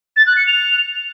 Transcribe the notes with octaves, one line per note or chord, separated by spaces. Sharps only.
A6
F#6
C#7
F7